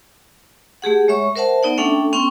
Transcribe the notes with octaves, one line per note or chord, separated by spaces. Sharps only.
A3 G4 G#4 F#5
G#3 C#5 E5 C#6
A#4 C5 E5 F#5 A5
B3 D#4 D5 F#5
A3 C#4 D4 A4 E5 G5
B3 C#4 G5 C6 C#6